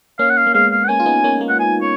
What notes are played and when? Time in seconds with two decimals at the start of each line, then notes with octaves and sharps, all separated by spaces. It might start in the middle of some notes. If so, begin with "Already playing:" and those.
0.19 A#3 C#4 F5
0.30 F#5
0.37 F5
0.47 A#3
0.54 G#3 B3 F5
0.72 F5
0.84 F#5
0.89 A#3 C#4 G#5
1.00 F4
1.06 B3 D#4
1.24 A#3 C#4
1.41 A#3
1.49 F#5
1.59 G#5
1.82 C#5